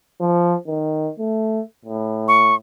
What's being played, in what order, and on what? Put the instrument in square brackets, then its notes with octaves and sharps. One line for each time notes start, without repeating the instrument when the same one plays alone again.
[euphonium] F3
D#3
A3
A2
[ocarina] C#6